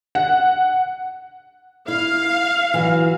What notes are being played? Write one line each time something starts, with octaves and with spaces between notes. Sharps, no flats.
F#5
E4 F5
E3 F#3